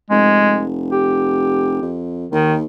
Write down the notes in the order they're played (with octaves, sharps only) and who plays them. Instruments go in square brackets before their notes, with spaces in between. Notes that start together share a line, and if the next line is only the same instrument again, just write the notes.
[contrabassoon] F1 [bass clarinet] G#3
[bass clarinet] G4
[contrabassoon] F2
[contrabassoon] D#2 [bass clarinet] D#3